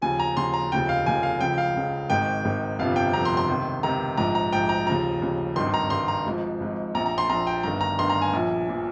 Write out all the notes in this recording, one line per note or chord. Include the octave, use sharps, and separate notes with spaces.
D#2 C#3 F3 G#5
A#5
D#2 C#3 F3 C6
A#5
F1 D#2 C#3 F3 G5
F5
F1 D#2 C#3 F3 G#5
F5
C#2 C#3 F3 G5
F5
C#2 C#3 F3
G#1 G#2 D#3 G5
G#1 G#2 D#3
G1 F2 C3 F3 F5
G5
G1 F2 C3 F3 A#5
C6
C6
C#2 C3 D#3
C#2 C3 D#3 A#5
A#1 G#2 F3 A#5
A#5
A#1 G#2 F3 G5
A#5
D#2 C#3 F3 A#5
D#2 C#3 F3
G#1 G2 D#3 C6
A#5
G#1 G2 D#3 C6
A#5
G#1 G#2 F3
G#1 G#2 F3
A#1 A#2 F3 A#5
A#5
C6
A#1 A#2 F3 A#5
G5
G1 G2 D#3 A#5
A#5
G1 G2 D#3 C6
A#5
G#5
A#1 A#2 F3
A#2 F3